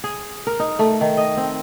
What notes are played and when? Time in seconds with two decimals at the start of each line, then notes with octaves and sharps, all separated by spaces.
0.04 G#4
0.47 A#4
0.60 D#4
0.79 A3
1.01 D#3
1.17 D#5
1.37 C4